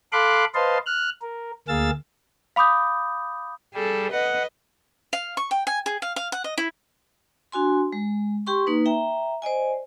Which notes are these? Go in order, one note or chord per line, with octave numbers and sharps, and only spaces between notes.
A4 F5 B5 C6 D6 F#6
B4 C5 D#5 F5 A5 C6
F6 F#6
A#4
D2 A#3 G#4 F5 E6 A6
F5 B5 D6 D#6 G6
G3 G#4 A4
B4 D#5 F#5
F5
C#6
G5
G#5
G#4
F5
F5
F#5
D#5
E4
D4 F#4 G#5 C6
G#3
G4 G5 C6 C#6
A#3 D#4 B4
E5 G5 A#5
C5 D5 D#5 G#5